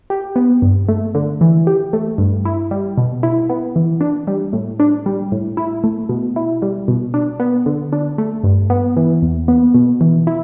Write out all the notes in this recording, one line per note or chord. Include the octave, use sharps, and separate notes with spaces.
G4
B3
G2
A3
D3
E3
G4
A3
G2
E4
G3
B2
E4
B3
E3
D4
G3
A2
D4
G3
A2
E4
A3
B2
E4
G3
B2
D4
B3
D3
D4
A3
G2
B3
E3
E2
B3
B2
E3
E4